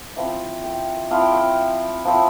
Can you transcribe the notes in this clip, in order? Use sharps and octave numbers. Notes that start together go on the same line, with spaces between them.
F3 C4 E4 E5
G5
F3 C4 E4 F5
G5
F5
F3 C4 E4